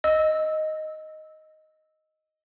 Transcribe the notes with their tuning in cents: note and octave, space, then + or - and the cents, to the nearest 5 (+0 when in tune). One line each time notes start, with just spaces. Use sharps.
D#5 +0 E6 -15